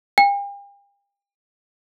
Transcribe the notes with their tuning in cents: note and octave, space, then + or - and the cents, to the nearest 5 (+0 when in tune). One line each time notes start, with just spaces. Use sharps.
G5 +45